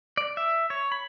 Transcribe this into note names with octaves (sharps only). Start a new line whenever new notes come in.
D5
E5
C#5
B5